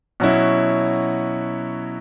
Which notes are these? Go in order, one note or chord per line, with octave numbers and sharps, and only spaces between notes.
B2 F#3 C#4 E4